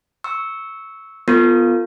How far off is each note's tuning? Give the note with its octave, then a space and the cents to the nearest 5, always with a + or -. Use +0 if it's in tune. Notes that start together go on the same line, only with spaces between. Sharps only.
C#6 +0 E6 -10
B3 +0 F4 +0 A4 +40